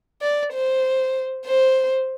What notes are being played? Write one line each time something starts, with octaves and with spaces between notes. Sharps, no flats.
D5
C5
C5